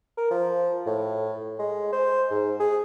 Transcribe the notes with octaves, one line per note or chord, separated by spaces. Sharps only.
A#4
F3
A2
G#3
C5
G#2
G#4